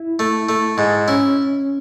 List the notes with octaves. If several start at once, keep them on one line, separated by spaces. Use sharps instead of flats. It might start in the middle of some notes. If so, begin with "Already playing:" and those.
Already playing: E4
A3
A3
G#2
C#4 E4